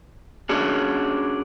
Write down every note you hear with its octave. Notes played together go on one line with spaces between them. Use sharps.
C#4 D4 F#4 G#4